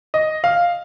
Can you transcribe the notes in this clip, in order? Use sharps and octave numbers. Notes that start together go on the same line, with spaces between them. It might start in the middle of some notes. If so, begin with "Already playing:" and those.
D#5
F5